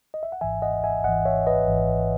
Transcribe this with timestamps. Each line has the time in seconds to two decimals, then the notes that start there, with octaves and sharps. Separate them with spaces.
0.14 D#5
0.23 E5
0.32 F#5
0.41 G#1 G#2 E3 E5 G#5
0.62 D#5 F#5
0.84 E5 G#5
1.04 G#1 G#2 E3 D#5 F#5
1.25 C#5 E5
1.47 B4 D#5
1.67 G#1 G#2 E3